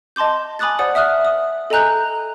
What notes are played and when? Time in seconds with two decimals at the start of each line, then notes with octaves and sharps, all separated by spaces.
0.16 D#5 A5 C6 D6 G6
0.59 G#5 B5 D6 D#6 F#6 A6
0.79 C5 D5 F#5 D#6
0.95 E5 D#6 F6 F#6
1.25 D#6
1.70 A4 D#5 G#5 A#5 F#6 G6